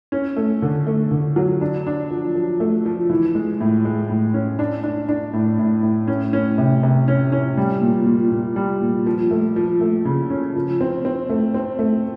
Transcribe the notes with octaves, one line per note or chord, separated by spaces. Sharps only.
C#4
A3
D3
A3
D3
F#3
D4
D4
F3
F3
A3
F3
E3
G#3
A2
G#3
A2
C#4
D4
D4
D4
A2
A2
A2
C#4
C#4
C3
C3
C#4
C#4
G3
A#2
A#2
A#2
G3
A#2
F3
A3
F3
A3
C#3
C#4
F3
C4
C4
A3
C4
A3